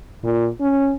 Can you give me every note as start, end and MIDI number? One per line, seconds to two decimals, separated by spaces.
0.24 0.48 46
0.60 0.95 61